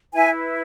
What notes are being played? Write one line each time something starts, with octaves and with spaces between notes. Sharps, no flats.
E4 B4 E5 G#5